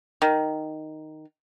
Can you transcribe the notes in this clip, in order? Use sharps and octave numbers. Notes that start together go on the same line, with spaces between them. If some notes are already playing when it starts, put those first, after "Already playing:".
D#3